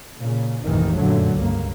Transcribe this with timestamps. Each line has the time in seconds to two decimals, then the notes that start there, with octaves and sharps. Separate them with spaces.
0.21 A#2 C#3
0.64 F1 A#1 G#2 C3 D#3 E3
0.95 F#2 A#2 D3 F#3 A3
1.34 C#2 G2 A#3